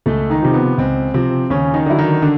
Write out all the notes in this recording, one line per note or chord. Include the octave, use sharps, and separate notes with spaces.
C#2 A3 A4
D#3 D#4
C3 F3
B3
C#2 C4
C3 F3 C4
D#2 C#3 C#4
D#3 D#4
D3 F#3 E4
D#3 D#4
D3 D4